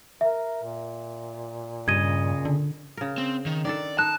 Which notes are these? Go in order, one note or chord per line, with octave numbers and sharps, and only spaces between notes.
A#4 E5
A#2
G2 C#3 D#5 G#6 D#7
D3
C#3 A#4
C4
D#3
D#3 D4 A4 D5
D#4 A5 F#6